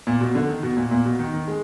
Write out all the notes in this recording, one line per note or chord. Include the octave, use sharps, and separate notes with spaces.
A#2
B2
D3
D#3
B2
A#2
A#2
B2
D#3
D#3
G#3